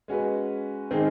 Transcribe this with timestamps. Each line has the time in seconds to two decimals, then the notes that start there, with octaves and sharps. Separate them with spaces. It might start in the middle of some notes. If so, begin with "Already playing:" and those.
0.08 G#3 C#4 F#4 B4
0.91 D#3 G#3 C4 D#4 G#4